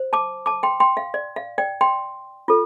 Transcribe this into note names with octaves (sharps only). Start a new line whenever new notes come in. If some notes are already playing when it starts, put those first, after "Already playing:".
Already playing: C5
A5 D6
A5 D6
G5 C6
G5 C6
F5
D5
F5
D5 G5
G5 C6
F4 A4